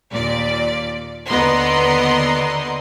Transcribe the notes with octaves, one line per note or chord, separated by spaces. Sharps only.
D#2 A#2 D5
D#2 D3 B3 D#5 A#5 C6